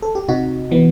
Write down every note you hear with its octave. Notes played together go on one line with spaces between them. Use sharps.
A4
G4
C3 D#4 F#4
E3 B3